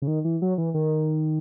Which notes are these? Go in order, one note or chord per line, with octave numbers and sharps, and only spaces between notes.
C#3
D#3
E3
F#3
E3
D#3